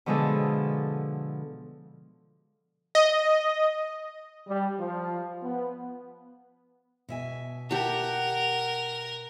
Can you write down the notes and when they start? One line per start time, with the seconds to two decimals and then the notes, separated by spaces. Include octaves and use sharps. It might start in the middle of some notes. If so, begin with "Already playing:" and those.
0.06 B2 D3 F3 G#3 G#4 A4
2.95 D#5
4.48 G3
4.78 F3
5.43 B3
7.09 B2 E5 G#5
7.71 G4 A#4 F#5 A5